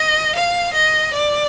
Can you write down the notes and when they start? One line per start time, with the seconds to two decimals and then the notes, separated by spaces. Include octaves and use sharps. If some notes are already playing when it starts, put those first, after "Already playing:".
Already playing: D#5
0.35 F5
0.74 D#5
1.13 D5